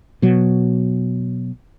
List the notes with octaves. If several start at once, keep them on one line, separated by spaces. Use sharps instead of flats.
B2 F#3